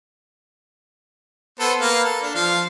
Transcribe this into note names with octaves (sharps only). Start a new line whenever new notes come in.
B3 A4 C5
A#3 B4 F5
A4
D4
F3 F5